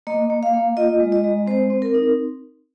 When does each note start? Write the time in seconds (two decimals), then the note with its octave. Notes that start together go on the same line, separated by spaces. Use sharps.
0.07 A#3 D#5
0.30 A#3
0.43 F5
0.54 A#3
0.77 F4 D#5
1.00 G#3
1.12 D#5
1.24 G#3
1.46 C4 C5
1.70 C4
1.82 A#4
1.94 D#4